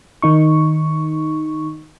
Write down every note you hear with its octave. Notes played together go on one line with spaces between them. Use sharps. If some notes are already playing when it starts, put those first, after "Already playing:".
D#3 D#4 C#6